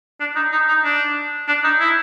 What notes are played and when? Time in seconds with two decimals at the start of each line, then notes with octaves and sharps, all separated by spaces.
0.20 D4
0.36 D#4
0.52 D#4
0.68 D#4
0.84 D4
1.48 D4
1.64 D#4
1.80 E4